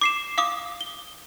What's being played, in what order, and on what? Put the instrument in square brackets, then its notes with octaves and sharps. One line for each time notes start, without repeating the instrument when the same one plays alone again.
[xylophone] D6 C7 E7
F5 D6 D#6
G7